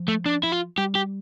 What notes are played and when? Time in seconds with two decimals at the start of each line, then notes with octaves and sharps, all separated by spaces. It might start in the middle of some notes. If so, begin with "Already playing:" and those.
Already playing: F3
0.08 A3
0.26 D4
0.43 E4
0.52 F4
0.78 G3 G4
0.95 G4